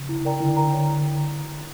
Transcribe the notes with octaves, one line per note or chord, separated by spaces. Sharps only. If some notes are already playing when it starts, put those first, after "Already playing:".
Already playing: C#3
E4
A#4 D5 G5 A#5
D3 E4
A#4 D5 G5 A#5
C#5